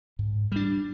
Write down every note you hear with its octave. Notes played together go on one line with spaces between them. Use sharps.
G#2
G3 D4